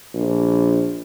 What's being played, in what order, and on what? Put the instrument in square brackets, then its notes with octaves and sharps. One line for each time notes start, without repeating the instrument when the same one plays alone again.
[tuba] A#1